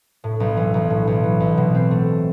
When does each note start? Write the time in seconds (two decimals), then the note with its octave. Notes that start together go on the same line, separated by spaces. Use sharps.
0.24 A2
0.40 B1
0.57 E3
0.74 B1
0.90 A2
1.07 B1
1.24 E3
1.40 B1
1.57 B2
1.75 C4
1.91 A3